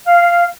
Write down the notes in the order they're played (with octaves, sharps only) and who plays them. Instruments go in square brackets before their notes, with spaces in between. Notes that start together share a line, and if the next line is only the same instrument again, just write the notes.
[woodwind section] F5